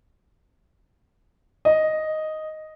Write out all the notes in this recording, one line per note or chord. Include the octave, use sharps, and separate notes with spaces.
D#5